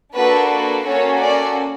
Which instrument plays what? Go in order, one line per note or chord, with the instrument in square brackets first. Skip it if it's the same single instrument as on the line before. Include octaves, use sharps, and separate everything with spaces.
[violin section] A#3 D4 F#4 A4 B4
B4
A#3 C#4 F#4 A4 C#5
D5